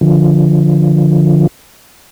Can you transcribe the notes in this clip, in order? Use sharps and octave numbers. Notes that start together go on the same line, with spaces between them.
D3 F3